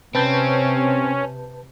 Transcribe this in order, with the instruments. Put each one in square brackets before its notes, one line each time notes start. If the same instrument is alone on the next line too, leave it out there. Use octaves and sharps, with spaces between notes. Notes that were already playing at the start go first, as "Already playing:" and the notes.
[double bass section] C3 [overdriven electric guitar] C4 [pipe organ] C#4 [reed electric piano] B4 A5 G6